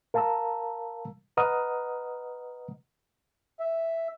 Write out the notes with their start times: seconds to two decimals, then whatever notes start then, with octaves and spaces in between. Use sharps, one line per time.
0.14 A#4 F5 A5 A#5 E6
1.37 B4 D#5 F#5 A#5 D#6 F6
3.60 E5